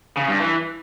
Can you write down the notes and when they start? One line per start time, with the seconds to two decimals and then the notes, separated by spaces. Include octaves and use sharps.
0.17 C#3
0.28 G2
0.40 E3